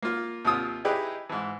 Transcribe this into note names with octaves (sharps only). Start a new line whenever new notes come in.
A#3 F4
D#2 C3 F4 D#6 E6
D#4 E4 G4 G#4 B4
G#2 E3